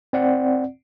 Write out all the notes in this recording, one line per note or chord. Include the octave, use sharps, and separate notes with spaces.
C4 D5 F#5